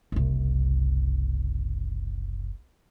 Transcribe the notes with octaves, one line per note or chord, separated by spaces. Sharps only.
F#1 C2